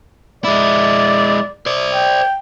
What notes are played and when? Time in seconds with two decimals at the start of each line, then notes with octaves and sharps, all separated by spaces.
0.44 G#3 E4 D5
1.66 C5 D5
1.94 G5